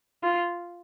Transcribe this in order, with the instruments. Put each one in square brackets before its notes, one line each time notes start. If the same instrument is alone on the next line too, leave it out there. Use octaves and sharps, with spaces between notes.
[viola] F4